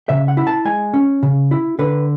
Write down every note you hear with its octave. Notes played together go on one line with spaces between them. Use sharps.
C#3 E5
F#5
E4
A5
G#3 G#5
C#4
C#3
E4
D3 B4